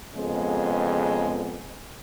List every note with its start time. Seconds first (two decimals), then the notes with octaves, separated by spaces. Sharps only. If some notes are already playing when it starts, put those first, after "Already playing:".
0.13 F2 C#3 G#3 B3